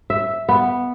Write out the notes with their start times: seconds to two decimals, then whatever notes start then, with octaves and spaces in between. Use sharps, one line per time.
0.10 E5
0.49 B3